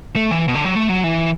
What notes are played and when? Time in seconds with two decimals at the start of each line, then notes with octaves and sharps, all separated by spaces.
0.16 A3
0.31 E3
0.48 B2
0.55 D3
0.65 F#3
0.75 A3
0.89 F#3
1.04 E3